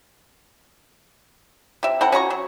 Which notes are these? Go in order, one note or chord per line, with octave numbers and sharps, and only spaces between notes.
C3 E5
C4 E4 A4 F#5
C#4 F#4 A#5 C#6
F#3